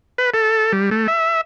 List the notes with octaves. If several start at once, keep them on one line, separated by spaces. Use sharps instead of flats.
B4
A4
G3
A3
E5